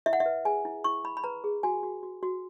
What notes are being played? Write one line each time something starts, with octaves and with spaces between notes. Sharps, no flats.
E4 E5
F#5
E5
B4
G#4 G#5
E4
E4 C#6
E4 B5
B5
B4 A#5
G#4
F#4 G#5
F#4
F#4
F#4